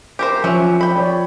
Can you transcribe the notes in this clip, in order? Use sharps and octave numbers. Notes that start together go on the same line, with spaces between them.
G4 A#4 C5
F3 F#3 C#4 E5
G5 B5
C#5 D5